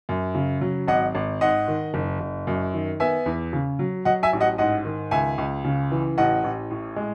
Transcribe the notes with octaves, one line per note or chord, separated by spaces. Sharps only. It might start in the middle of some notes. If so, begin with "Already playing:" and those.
F#2
C#3
F#3
G#1 D#5 F#5
G#1
G#2 D#5 F#5
D#3
F#1
F#1
F#2
D#3
B3 E5 G#5
E2
C#3
F#3
F#3 D#5 F#5
E5 G#5
A1
D#5 F#5
G#2 D#5 F#5
D#3
C#2 E5 G#5
C#2
C#3
E3
A1 D#5 F#5
A1
A2
G#3